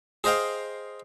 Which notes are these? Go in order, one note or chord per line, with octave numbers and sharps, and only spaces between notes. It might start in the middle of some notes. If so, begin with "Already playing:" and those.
G#4 C5 D#5 F5 G5